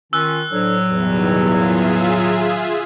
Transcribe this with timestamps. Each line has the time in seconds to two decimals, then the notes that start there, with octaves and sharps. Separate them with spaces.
0.13 D#3 C#4 F4 E6 F#6
0.52 A2 F#3 D4 A4 C5
0.92 E2 B2 D#3 G3
1.37 F4 G#4 E5